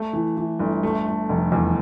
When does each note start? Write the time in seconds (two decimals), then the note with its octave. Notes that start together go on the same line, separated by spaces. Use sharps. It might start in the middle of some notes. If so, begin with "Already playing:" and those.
Already playing: A3
0.13 E3
0.37 E3
0.60 G1
0.83 A3
1.07 A3
1.29 F1
1.52 E2